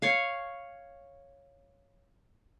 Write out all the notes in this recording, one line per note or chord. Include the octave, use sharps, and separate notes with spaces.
C#5 F5